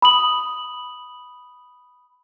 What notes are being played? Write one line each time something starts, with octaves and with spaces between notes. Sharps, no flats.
B5 D#6 F#7